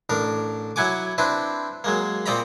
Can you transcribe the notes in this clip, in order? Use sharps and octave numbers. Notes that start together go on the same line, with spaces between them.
A1 D4 A#4
F#3 E4 F#5 G#5 D6
C4 D4 E4 B4
F#3 G#3 A#3
A#2 C4 D5 D#5 A#5 B5